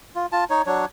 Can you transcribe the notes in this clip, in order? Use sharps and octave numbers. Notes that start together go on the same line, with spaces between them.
F4
F4 A5
D#4 C#5
F#3 D4 C#5